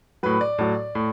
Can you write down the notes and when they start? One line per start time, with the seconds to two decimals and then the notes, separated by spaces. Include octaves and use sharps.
0.23 A2 F#3 B4
0.41 D5
0.58 A2 F#3
0.95 A2